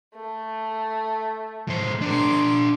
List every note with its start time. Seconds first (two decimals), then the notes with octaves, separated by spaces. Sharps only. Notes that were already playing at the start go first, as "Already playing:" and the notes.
0.15 A3
1.68 A2 C5
2.02 D4 A#4 C6 D6